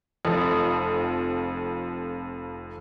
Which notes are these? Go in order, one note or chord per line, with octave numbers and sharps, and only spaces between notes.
F1 F2